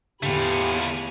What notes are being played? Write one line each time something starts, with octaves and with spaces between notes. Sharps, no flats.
E2 A2 D3 A3 F4 G4 G#5 B5